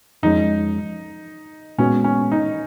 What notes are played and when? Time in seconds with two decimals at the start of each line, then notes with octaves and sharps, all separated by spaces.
0.23 F2 F3 G#3 C#4 D#4
1.78 A#2 G#3 B3 C#4 F#4
2.04 C#4
2.32 D#4